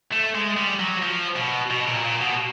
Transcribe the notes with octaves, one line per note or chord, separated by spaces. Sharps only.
A3
G#3
G3
F#3
F3
B2
B2
A#2
A#2
B2